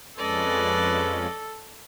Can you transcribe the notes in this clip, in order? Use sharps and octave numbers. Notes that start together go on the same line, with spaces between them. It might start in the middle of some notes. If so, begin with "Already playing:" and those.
F2 G#3 C#4 A4 B4 D5 D#5